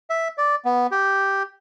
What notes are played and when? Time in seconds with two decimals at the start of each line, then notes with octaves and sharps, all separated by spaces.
0.10 E5
0.38 D5
0.65 B3
0.91 G4